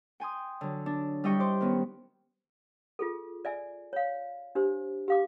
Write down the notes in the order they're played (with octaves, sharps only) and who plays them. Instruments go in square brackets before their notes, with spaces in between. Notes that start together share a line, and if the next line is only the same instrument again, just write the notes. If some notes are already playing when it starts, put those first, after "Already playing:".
[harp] G5 G#5 C6 D#6
D3 F#3
D4
G3 E4 D#5 G5 C#6
C5 C6 D6
D#3 B3 C#4
[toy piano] F4 G#4 A4
D5 E5 G#5
C#5 F5
D4 G4 C5
G4 F5 D6